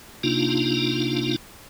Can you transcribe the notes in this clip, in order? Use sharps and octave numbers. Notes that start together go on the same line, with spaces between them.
C3 A#3 D4 D#4 F4